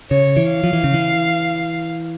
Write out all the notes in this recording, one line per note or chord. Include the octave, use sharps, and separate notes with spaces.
C#3 C#5
E3
F5
F3
E3
C#3
E3